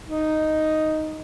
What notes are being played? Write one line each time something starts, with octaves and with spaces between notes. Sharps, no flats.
D#4